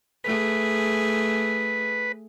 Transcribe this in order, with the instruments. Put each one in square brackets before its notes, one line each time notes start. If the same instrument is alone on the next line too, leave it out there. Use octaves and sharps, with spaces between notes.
[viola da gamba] A3 G#4 [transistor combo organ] B4